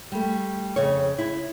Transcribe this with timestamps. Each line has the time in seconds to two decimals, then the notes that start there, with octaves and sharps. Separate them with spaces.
0.12 G3 A3
0.76 F2 C#3 C#5
1.18 E4